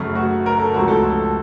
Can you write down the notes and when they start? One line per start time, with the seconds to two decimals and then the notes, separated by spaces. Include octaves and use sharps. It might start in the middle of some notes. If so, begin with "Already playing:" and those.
Already playing: F#2 C#3 A3
0.15 F#4
0.46 A#4
0.60 A4
0.74 C#2 C3 F3 A3 F#4
0.88 A4